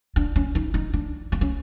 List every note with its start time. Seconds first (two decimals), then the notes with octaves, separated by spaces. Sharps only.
0.16 D4
0.36 C#4
0.55 D#4
0.74 D#4
0.93 D4
1.32 C4
1.41 C#4